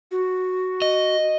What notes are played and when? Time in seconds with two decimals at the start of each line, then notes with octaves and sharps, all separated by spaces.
0.11 F#4
0.82 D#5